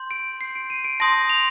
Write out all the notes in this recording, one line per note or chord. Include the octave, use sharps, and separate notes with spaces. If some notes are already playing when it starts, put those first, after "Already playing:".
Already playing: C6 G6
D7
C6 G6 C7
D7
D#7
D7
A5 C6 D#6 G6 A#6
F7